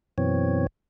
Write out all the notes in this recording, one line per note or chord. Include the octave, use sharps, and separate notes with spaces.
F#2 B2 E3 C4 C#5